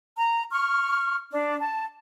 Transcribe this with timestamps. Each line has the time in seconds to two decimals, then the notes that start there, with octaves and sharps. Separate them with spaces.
0.17 A#5
0.52 C#6 F6
1.32 D4
1.58 A5